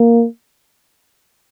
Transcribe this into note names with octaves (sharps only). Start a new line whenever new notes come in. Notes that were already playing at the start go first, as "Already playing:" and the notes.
Already playing: A#3